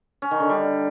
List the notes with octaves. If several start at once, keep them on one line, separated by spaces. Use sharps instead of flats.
C#4
D#3
D3
G3